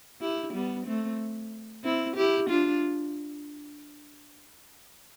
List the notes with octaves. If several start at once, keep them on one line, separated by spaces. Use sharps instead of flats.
E4 G4
G3 B3
A3 C4
C4 E4
E4 G4
D4 F4